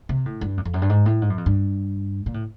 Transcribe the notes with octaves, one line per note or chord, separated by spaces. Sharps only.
C3
A2
G2
F#2
F2
F#2
G2
G#2
A2
G#2
F#2
F2
G2
A#2
A2